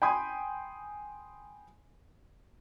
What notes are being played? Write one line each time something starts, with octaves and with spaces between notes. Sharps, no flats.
G5 G#5 B5 C6 D#6 G#6